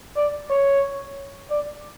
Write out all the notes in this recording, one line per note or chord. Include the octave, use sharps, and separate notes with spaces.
D5
C#5
D5